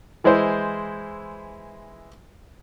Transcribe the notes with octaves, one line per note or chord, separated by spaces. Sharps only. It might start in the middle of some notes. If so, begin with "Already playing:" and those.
E3 G#3 E4 C5